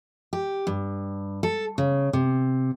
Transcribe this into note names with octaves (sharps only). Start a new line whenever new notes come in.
G4
G2
A4
C#3
C3